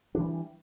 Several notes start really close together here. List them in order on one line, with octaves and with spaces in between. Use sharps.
D4 E3 G3